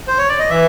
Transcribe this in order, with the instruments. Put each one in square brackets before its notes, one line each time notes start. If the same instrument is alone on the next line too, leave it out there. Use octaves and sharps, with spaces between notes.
[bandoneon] C5
C#5
D5
D#5
[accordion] E3 [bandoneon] E5